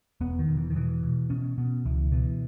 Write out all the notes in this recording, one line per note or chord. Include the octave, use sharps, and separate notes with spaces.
E1 B3
D#3
E1
E3
D#3
B2 E3
B2
B2 C#4
B2 B3
C#2 E3
B2 E3